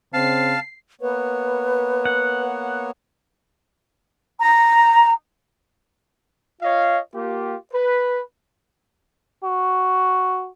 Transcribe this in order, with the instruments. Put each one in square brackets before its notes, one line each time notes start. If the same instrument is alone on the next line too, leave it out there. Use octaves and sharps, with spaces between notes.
[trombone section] C#3 C4 [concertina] F5 A5 [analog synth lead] C7
[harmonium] A#3 B3 C#5 [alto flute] B4
[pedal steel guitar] F#5
[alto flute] A#5
[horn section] F4 C#5 D#5 F5
A#3 F4 G4
B4
[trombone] F#4